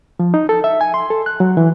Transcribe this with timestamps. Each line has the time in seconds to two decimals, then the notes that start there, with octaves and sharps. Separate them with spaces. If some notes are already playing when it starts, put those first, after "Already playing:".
0.20 F3
0.34 D#4
0.49 A4
0.64 E5
0.81 G#5
0.94 C6
1.10 A4
1.26 F#6
1.40 F#3
1.57 E3